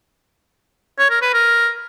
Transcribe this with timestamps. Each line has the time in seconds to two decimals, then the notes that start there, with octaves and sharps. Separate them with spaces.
0.99 C#5
1.10 A#4
1.22 B4
1.33 A#4